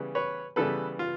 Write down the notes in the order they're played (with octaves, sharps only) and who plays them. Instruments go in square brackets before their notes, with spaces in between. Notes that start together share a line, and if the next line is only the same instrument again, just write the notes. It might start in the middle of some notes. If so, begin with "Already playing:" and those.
Already playing: [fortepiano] C#3 E3 G3 B3
B4 C#5
C#3 E3 G3 B3 A4 B4
F4